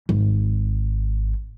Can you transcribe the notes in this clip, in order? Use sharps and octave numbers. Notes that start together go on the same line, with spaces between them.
G#1